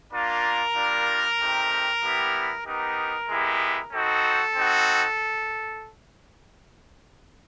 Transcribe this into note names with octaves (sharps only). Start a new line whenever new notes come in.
A#3 D4 F4 A#4
G3 A#3 D4 F4
A3 C4 D#4 G4
G3 B3 E4 G4
B3 D#4 G4 A#4
G#3 B3 E4 G4
C4 D#4 F#4 A4
C4 D#4 F#4